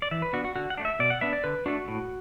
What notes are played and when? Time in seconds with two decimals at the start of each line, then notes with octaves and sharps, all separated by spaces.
0.02 D5
0.11 E3 E5
0.22 B4
0.33 B3 D4 F#4
0.44 F#4
0.56 D3 F#4
0.70 F#5
0.78 A3 D4
0.85 E5
0.99 B2 D5
1.10 F#5
1.21 B3 D4 E5
1.33 D5
1.44 D3 B4
1.66 A3 D4 F#4
1.88 A2